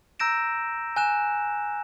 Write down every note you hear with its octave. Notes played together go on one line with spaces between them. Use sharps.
A#5 E6 G6 A#6 D7 E7
G#5 F#6 E7